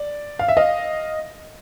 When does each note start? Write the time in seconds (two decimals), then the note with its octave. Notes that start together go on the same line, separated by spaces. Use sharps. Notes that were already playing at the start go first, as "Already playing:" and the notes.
Already playing: D5
0.39 F5
0.48 E5
0.57 D#5 F5